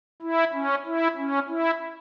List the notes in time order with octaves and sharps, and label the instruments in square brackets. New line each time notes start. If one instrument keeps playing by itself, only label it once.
[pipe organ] E4
C#4
E4
C#4
E4